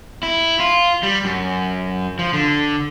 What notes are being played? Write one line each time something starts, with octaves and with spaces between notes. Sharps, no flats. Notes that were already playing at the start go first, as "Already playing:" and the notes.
E4
F4
G3
F#2
F3
D3